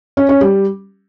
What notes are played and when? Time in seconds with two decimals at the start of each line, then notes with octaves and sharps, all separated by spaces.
0.17 C#4
0.29 C#4
0.41 G3